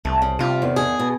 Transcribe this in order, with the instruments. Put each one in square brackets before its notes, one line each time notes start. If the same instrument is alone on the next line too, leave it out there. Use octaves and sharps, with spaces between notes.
[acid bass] C2 [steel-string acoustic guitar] A3
[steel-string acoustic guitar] C#3
[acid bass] C3 [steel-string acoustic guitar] G3 F4
[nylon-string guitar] E2 D#3
[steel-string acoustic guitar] G#4
[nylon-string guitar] B2